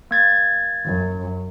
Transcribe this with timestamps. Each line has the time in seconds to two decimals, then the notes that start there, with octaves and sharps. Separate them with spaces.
0.11 A#3 G#6 A6
0.85 F#2